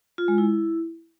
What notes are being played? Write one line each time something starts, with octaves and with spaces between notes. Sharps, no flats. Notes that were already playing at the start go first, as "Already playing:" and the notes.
F4
G#3
E4